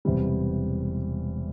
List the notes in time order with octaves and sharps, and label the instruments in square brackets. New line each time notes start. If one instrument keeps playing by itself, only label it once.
[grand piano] E1 E2 C3 E3 G3